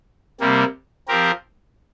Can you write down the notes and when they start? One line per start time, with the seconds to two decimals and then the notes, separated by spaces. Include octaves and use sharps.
0.41 C3 G3 A#3
1.08 F3 C4 G4 A#4